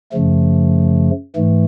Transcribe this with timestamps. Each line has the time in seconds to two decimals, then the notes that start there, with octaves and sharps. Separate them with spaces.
0.12 F#2 C#3 F3 A3
1.36 G#2 E3 A3